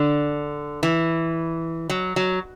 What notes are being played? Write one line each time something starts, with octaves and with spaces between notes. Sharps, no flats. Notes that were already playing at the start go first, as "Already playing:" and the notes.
Already playing: D3
E3
F#3
F#3